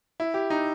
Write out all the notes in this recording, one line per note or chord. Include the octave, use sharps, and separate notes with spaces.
E4
G4
D#4